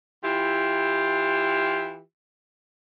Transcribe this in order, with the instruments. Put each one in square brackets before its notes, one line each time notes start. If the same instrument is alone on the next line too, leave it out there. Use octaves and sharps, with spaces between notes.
[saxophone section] E3 E4 F4 G4